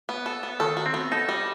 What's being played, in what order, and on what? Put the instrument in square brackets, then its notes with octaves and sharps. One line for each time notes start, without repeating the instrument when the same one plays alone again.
[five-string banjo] B3
A4
B3
[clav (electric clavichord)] D#3 [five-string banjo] A4
[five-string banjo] F#4
[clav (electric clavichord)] C4
[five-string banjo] B3
[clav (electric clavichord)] D#4 [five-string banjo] A4
[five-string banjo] G3